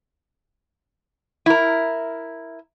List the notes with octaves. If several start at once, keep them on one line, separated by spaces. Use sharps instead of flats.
E4 A#4